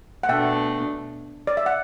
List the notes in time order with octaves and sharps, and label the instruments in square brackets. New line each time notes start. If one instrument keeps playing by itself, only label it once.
[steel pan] F#5
[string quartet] B2 A3 D4 [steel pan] E5 G5
[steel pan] D5
E5
F#5